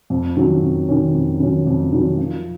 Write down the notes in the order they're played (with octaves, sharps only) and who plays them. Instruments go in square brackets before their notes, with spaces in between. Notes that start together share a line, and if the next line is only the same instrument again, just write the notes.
[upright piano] F2
D#3 F#3 C#4
F2
D#3 F#3 C#4
F2
D#3 F#3 C#4
F2
D#3 F#3 C#4
F3